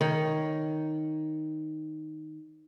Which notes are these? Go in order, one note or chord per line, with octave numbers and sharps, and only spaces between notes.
D#3 C#5